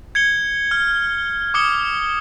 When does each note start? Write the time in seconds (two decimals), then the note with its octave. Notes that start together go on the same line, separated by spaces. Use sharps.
0.15 G#6 C#7 G7
0.71 F6
1.54 D6 D#6 F6 C#7 G7